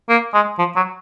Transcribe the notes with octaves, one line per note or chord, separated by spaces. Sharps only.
A#3
G#3
F3
F#3